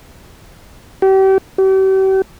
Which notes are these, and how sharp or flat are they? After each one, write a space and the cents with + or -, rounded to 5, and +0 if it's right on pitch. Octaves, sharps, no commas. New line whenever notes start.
G4 -35
G4 -40